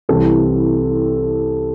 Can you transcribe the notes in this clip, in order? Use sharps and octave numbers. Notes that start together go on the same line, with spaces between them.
C2 C3 E3 C4 A4